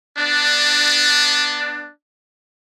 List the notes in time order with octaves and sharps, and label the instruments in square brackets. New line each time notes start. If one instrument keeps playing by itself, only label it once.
[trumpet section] B3 D4